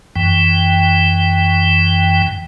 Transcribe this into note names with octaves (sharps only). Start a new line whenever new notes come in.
F#2 E3 G5